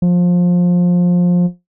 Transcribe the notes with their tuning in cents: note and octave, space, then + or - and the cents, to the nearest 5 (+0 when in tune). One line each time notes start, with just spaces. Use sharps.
F3 +20